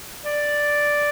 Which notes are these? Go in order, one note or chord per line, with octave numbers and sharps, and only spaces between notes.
D5